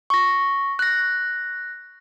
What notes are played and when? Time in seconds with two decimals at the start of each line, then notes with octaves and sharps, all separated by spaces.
0.10 C#6 A#6
0.79 F#6 A#6